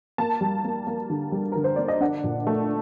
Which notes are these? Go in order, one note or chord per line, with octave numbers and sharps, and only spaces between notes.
A#3 A5
G3
A#3
A#3
D3
G3
D3 A#4
C5
A#3 D5
D#5
D4 F#5
A#2
A3